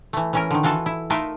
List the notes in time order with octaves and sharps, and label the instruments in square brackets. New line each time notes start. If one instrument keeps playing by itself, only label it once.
[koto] E3 A3
E3 C#4 A#4
D3 D#3
E3 F4 F#4 A4
E4
A3 D#4 F4 A#4 B4 E5